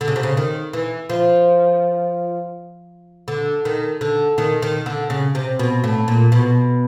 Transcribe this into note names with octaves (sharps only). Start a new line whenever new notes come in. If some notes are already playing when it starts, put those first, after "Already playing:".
D3
C#3
C3
C#3
D#3
E3
F3
D3
D#3
D3
D#3
D#3
D3
C#3
C3
B2
A2
A#2
B2